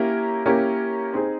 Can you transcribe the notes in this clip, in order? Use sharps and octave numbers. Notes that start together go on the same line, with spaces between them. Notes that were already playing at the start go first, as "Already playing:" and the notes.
Already playing: A#3 C#4 E4 G4 A#4
A#3 C#4 E4 G4 A#4
C4 D#4 G#4